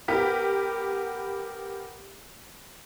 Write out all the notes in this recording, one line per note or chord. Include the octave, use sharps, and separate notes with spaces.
B3 G4 A#4 B6